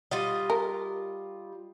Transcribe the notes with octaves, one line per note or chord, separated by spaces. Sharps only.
G3 F4 D#5
A#4